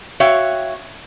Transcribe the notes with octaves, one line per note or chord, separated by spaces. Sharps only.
F#4 C#5 E5 F5 G5